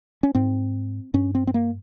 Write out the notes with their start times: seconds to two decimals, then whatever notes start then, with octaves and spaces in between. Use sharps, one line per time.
0.23 C#4
0.35 G#2 C4
1.14 G2 C#4
1.35 C4
1.47 C4
1.54 A#3